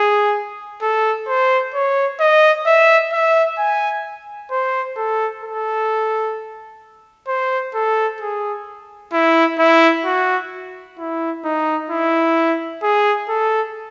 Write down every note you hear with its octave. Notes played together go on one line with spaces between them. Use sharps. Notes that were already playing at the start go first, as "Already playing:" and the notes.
Already playing: G#4
A4
C5
C#5
D#5
E5
E5
G#5
C5
A4
A4
C5
A4
G#4
E4
E4
F#4
E4
D#4
E4
G#4
A4